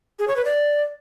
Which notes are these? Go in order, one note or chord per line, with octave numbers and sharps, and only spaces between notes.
G#4
C#5
B4
D5